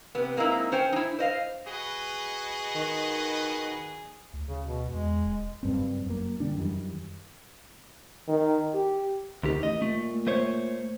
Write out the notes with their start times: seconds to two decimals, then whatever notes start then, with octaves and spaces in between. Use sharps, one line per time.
0.15 C3 B3
0.37 G#3 A#3 C4 D#4 E4
0.72 C#4 C5 G5 G#5
0.92 D#4 E4
1.19 C5 D#5 F5
1.67 F#4 G#4 B4 D#5
2.75 D#3
4.33 D2
4.49 C#3
4.65 B2
4.89 E2 G#3
5.24 D#1
5.63 F#1 G2 C4
6.06 F#2 A#3
6.40 D3 G3 D4
6.58 F#2 D#3 E3 G3
8.28 D#3
8.74 G4
9.43 D2 D#3 G4
9.63 A1 D#5
9.82 A#2 A3
10.27 A3 C5 C#5